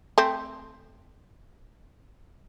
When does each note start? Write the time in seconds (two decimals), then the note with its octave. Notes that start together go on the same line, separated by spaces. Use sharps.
0.18 A3 C4